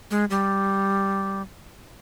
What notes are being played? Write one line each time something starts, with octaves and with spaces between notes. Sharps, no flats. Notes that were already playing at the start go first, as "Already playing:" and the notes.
G#3
G3